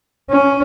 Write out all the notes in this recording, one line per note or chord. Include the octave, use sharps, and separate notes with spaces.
C#4